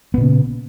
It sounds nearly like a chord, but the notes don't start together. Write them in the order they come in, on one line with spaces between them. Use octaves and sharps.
B3 A#2 C#3